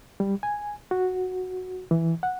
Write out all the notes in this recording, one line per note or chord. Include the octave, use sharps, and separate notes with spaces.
G3
G#5
F#4
E3
F#5